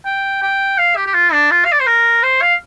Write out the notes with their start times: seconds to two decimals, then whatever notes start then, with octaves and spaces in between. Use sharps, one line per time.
0.05 G5
0.42 G5
0.78 F5
0.96 G4
1.06 G4
1.14 F4
1.32 D4
1.51 F4
1.65 F5
1.72 D5
1.80 C5
1.86 A#4
2.23 C5
2.41 F5